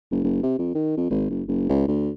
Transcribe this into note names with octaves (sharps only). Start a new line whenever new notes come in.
F#1
F#1
C3
F2
D#3
F2
G#1
F#1
F#1
C#2
D2